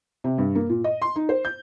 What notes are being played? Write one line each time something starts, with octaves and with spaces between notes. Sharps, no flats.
C3
G2
A#3
A#2
D#5
C6
D#4
C5
G6